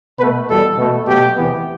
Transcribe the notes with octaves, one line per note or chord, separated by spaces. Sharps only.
B2 A3 B4
E2 B2 G3 A4
B2 A3
B2 F#3 A3 G4
E2 C3 E3 B3